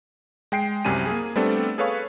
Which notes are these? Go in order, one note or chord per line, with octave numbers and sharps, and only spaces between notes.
G#3 G5 C7 D7
C2 F#2 C3 G3 G#5 D#7
A#3 G#4
G3 A3 B3 C4 D4 A4
G#4 A4 B4 C#5 F5 C#6